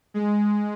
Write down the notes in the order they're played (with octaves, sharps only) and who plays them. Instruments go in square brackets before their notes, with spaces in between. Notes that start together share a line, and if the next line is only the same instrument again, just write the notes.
[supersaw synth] G#3